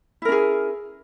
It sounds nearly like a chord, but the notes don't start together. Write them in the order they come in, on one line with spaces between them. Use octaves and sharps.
E4 A#4 C#4 G#4